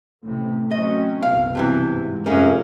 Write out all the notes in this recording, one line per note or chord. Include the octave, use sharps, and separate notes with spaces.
A1 A2 C3 A3
F#3 C4 C#4 D#5
F#1 C2 B2 B3 F5
G2 C3 E3
G#2
F1 F#2 A#3 C#4 G#4